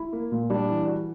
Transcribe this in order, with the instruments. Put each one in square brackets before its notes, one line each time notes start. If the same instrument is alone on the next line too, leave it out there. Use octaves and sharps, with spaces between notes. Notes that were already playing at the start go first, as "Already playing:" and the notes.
Already playing: [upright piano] E4
A#3
A#2
[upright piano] G3 [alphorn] D4
[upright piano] E3
F#4